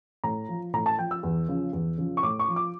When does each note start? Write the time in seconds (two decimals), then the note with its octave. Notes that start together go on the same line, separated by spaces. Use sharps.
0.24 A2 A#5
0.49 F3
0.73 A2 A#5
0.86 A5
0.98 F3 G5
1.11 E6
1.23 E2
1.48 C#3 F3
1.73 E2
1.98 C#3 F3
2.17 C#6
2.23 A2 D6
2.39 C#6
2.48 F3
2.56 D6